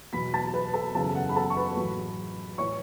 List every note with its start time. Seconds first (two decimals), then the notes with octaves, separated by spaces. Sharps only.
0.13 E2 B2 F#3 B5 B6
0.34 A5 A6
0.53 B4 B5
0.74 A4 A5
0.95 F#1 E2 C#3 E3 A4 A5
1.15 F#5
1.29 B5
1.36 A4 A5
1.50 C#6
1.57 B4 B5
1.77 A1 A2 F#3
2.58 A2 E3 C#5 C#6